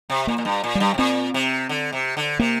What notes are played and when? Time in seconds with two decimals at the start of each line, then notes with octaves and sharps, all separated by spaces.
0.10 C3
0.27 A#2 A#3
0.38 A#2
0.45 G2
0.64 A#2
0.75 G2 G3
0.94 C3
0.98 A#2 C4
1.34 C3
1.69 D3
1.93 C3
2.17 D3
2.39 C3 A#3